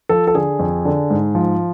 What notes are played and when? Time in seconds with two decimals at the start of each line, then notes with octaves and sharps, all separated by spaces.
0.09 F3 A4
0.27 A4
0.34 D3 G#4
0.59 F2
0.85 D3
1.10 G#2
1.35 F3